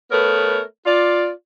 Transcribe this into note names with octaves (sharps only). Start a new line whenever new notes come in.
A3 B3 A#4 B4 C#5
F4 D5